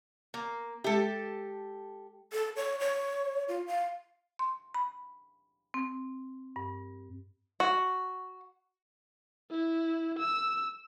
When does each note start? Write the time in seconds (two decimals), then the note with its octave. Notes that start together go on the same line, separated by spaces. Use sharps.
0.34 A#3
0.84 G#3 G4 A4 E5
2.33 A4
2.56 C#5
2.80 C#5
3.48 F4
3.67 F5
4.39 C6
4.74 B5
5.74 C4
6.56 G2
7.60 F#4
9.51 E4
10.19 E6